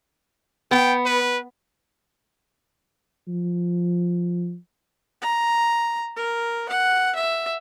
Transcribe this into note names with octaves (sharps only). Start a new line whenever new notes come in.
B3 G5
B4
F3
A#5
A#4
F#5
E5